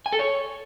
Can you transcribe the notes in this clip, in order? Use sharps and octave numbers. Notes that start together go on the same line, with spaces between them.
G#5
A4
C#5